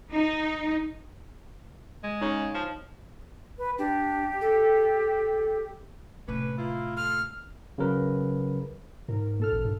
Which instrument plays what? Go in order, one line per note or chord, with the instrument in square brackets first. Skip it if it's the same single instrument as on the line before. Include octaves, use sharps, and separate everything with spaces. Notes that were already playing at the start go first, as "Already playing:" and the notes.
[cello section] D#4
[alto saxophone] G#3
[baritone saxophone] C#3 [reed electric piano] D#4 C#5
[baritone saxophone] F3
[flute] B4
[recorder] D4 [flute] G4
[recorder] A4
[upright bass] A2 C3 [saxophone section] C#4 D4 B4
[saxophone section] A#3 E4 F4
[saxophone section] F4 A4 [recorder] F6
[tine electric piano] C#3 F#3 A#4 B4
[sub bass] G#2 [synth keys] A#4
[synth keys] A#2 A4 F6
[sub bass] A1
G2